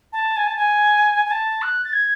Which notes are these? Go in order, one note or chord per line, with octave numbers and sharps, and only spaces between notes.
A5
G#5
A5
G#5
G#5
A5
F#6
A6
G#6